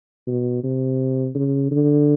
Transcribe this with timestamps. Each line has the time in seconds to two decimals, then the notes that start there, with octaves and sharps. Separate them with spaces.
0.27 B2
0.64 C3
1.35 C#3
1.71 D3